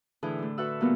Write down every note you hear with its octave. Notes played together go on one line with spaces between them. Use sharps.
A2 D3 E3 G#4
A3 D4
F#4 A4 B4 E5 F#5 E6
A#2 G3 A#3 B3